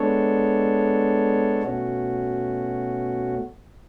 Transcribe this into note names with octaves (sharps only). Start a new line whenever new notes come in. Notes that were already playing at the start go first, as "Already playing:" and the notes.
Already playing: G#3 B3 D4 A4 C#5
B2 A3 C#4 F#4